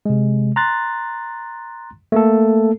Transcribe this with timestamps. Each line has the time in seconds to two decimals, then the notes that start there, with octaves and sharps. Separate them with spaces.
0.06 C3 G#3
0.56 A#5 C6 F#6 A6
2.12 A3 A#3 A4